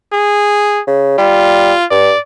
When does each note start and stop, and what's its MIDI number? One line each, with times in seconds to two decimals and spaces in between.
0.13 0.80 68
0.87 1.14 49
1.18 1.73 55
1.18 1.85 65
1.91 2.12 43
1.91 2.19 74